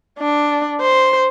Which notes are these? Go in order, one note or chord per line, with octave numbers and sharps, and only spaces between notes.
D4
C5